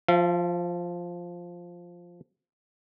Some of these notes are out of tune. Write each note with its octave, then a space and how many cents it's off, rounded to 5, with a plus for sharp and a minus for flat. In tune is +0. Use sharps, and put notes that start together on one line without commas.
F3 +0 F5 -45